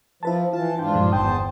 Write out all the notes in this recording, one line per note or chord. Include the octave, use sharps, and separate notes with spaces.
F3 E4 B4 A5
E3 F4 A5
G#2 D4 F4 G5
G2 A#2 F3
G1 E2 C5 G5 A5 D#6